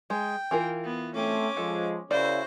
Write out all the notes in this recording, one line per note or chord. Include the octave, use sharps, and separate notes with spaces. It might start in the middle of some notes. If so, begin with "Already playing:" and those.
G#3 G5
E3 F4 A#4
B3
A3 C4 C#4 D6
F3 G#3 A4
C#3 E4 F#4 A#4 C5 D5